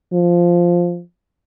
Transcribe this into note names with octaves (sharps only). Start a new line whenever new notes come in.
F3